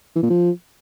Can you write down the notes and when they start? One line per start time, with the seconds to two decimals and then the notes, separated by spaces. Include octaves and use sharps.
0.16 E3
0.23 A#2
0.30 F3